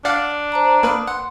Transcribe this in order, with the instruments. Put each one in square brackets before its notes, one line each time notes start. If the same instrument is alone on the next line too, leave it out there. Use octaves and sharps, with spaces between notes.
[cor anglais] D4 [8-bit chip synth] D5 F5 F#5
[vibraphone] C5 A5 A#5
[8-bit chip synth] A#3 B4 [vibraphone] D#6 E6
[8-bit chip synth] F#5 [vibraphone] C6